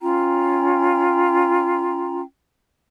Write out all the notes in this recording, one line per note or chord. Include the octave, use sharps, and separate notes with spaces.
C#4 F4 G5 A#5